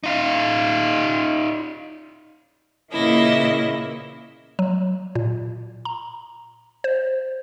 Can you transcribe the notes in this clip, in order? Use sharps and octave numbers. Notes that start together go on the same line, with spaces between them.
D#4 F4
A#2 C#3 E3 A#3 E4 D#5
F#3
A#2
A#5
C5